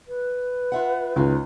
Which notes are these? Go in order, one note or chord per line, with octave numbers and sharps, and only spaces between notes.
B4
F4 E5 F#5
C#2 D#3 D#4 G#4